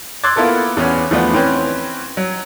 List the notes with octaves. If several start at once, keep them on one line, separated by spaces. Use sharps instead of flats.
C6 D6 E6 F#6 G#6 A6
A#3 B3 E4 F4 A4 A#4
E2 B3 C#4
E2 F3 A3 B3 D4
E3 C4 C#4 B4 C5
F#3